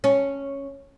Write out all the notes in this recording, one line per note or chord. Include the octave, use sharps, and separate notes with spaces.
C#4